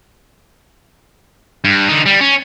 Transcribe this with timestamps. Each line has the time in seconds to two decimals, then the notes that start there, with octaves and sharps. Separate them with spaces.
1.64 G2
1.89 D3 D#4
2.06 G3
2.21 C#4